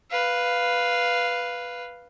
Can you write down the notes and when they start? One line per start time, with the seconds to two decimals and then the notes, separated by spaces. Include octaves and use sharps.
0.11 B4 F5